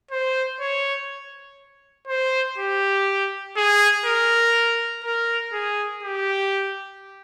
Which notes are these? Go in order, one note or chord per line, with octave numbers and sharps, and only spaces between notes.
C5
C#5
C5
G4
G#4
A#4
A#4
G#4
G4